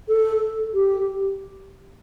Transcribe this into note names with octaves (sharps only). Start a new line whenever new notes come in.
A4
G4